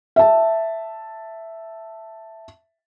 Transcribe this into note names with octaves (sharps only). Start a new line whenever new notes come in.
E5 A5